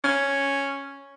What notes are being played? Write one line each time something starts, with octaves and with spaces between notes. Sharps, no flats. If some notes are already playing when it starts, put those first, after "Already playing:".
C#4